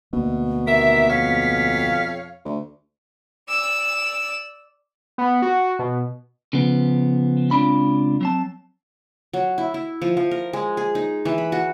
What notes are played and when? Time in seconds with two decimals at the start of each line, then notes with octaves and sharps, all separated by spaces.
0.13 D2 B2 A#3
0.67 D#2 A#4 E5 B6
1.09 F2 C#5 F5
2.45 D2
3.49 D5 E6
5.18 B3
5.42 F#4
5.79 B2
6.53 C#3 F3 B3
7.51 C#2 D3 C4 D4 F4 B5
8.21 F#3 C4 A5
9.33 F#3
9.58 E4
9.74 E4
10.02 F3
10.17 F3
10.31 A#4
10.53 G#3
10.77 G#4
10.95 D#4
11.25 E3
11.38 B5
11.52 F#4